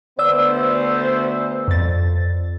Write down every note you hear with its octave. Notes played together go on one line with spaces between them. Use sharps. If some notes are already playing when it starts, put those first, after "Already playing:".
D2 B3 C5 D5 E6
F2 A6